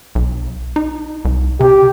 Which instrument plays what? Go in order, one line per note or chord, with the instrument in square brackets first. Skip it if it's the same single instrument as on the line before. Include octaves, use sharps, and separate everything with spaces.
[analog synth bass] B1
D#4
C2
[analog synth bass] C3 [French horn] G4